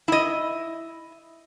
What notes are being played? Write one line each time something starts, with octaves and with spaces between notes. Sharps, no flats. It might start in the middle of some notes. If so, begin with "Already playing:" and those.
E4 D#5